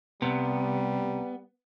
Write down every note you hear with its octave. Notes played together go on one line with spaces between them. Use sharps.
C2 F#2 C3 G3 B3